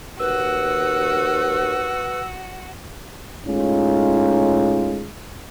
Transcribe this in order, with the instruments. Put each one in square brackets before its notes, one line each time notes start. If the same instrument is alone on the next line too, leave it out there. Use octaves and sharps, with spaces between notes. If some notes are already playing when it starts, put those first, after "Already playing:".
[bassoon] D#2 [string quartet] F#4 [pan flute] B4 [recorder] E6
[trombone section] A2 G#3 C#4 D#4 F4